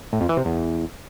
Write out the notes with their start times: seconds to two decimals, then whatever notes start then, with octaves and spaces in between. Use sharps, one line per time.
0.13 A2
0.21 F2
0.29 E3
0.37 C3
0.45 E2